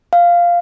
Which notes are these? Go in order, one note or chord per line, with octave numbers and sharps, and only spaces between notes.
F5